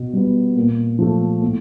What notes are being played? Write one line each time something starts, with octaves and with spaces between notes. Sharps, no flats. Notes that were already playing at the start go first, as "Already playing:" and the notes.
Already playing: B2
G3 B3
A#2
F3 A3
A2